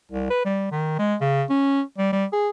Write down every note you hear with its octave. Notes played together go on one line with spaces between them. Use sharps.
C2
B4
G3
D#3
G#3
C#3
C#4
G3
G3
G#4